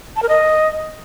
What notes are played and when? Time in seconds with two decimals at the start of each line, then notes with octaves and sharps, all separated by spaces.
0.16 A5
0.22 A#4
0.29 D#5